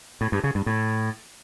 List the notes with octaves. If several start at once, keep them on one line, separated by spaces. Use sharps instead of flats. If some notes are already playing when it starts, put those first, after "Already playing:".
A2
G2
C#3
G2
A2